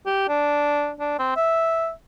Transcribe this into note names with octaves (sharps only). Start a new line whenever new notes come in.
G4
D4
D4
C4
E5